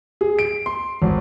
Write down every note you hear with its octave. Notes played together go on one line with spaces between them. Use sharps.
G#4
D7
C6
G#1